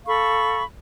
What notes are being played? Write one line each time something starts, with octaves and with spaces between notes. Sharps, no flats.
A4 F5 B5 C#6